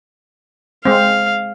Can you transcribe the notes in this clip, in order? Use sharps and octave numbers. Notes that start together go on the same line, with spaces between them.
G#3 C4 F5